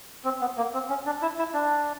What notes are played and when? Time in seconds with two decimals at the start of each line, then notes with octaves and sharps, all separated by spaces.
0.25 C4
0.41 B3
0.57 A#3
0.74 C4
0.89 C#4
1.06 D4
1.22 E4
1.39 E4
1.54 D4